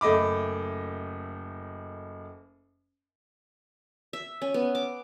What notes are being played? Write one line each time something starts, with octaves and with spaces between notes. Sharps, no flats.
F#1 A3 D#5 B5 D6
E5
C#4
B3
D6